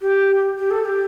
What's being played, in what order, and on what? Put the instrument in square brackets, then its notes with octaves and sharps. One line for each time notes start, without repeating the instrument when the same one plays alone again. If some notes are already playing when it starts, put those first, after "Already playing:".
[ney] G4
G4
A4
A4
G4